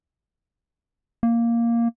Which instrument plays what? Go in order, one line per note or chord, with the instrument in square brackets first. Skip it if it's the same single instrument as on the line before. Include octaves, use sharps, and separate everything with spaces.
[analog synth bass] A#3